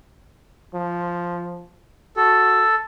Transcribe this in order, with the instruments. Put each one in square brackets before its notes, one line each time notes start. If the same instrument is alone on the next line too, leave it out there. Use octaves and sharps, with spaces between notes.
[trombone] F3
[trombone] F#4 [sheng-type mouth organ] A4